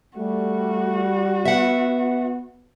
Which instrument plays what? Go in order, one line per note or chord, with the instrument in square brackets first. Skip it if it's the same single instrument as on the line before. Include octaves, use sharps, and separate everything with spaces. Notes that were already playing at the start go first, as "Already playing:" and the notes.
[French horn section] G3 [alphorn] A3 [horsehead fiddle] F#4
[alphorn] B3 [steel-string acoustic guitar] E5 F#5